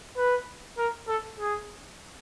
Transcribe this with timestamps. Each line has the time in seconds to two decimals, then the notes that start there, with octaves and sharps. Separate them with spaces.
0.17 B4
0.78 A#4
1.08 A4
1.39 G#4